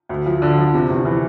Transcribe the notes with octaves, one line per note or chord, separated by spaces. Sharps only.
D2
F3
D3
F3
C3
E2
E3